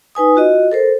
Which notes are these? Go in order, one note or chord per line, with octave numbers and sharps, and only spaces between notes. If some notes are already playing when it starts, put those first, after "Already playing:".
D#4 B4 G#5 D#6
F4 F#4 D#5
A4 A#4 C5